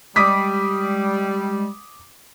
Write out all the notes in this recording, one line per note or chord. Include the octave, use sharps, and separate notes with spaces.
G3 G#3 D6 D#6 B6